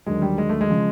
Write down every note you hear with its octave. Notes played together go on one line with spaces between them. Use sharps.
D#2 D3 F#3 G#3
G3
G#3
A3
G#3
C#3 F3